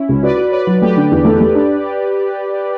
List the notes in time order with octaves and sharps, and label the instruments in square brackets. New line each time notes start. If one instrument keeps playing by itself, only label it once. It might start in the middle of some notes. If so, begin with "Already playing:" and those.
Already playing: [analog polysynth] C#4 E4
[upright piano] C#2
[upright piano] F#4 [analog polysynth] B4 D5
[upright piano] F#4
[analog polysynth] B4 D5 [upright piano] C#5
[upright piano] F#3
[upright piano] A3 [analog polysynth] G4 B4
[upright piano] D3
E2
A3
A3
D4